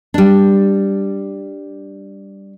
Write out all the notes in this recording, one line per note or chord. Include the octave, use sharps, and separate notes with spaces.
G3 D4